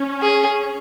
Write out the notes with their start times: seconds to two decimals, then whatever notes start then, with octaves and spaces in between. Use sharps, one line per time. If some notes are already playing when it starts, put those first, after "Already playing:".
Already playing: C#4
0.22 G#4